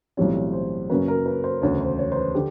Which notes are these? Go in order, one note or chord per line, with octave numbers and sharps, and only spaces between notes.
B1 A2 E3 G3 C4 C#5
C5
F#2 C#3 F#3 A#3 C#4 B4
A#4
B4
C5
E1 D2 C#3 C#5
C5
C#5
C5
B4
D3 G4